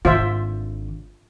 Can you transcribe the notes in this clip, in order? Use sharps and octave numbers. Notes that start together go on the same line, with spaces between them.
G#1 D3 F4 C5 E5